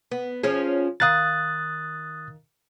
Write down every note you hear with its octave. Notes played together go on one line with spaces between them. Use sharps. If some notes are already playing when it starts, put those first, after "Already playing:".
B3
F3 C#4 G#4
D#3 F5 D#6 F#6 A6